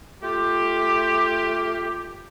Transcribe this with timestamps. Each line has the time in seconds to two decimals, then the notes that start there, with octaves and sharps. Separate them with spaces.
0.23 A3 F4 G4